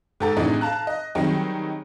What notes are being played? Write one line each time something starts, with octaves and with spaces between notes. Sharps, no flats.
G#2 G4 A4 A#5 A6
A2 C3 E3 D4 D#4 G#4
F5 A5 A#5 F#6
D#5
D#3 F#3 G3 C4 D#4 G#4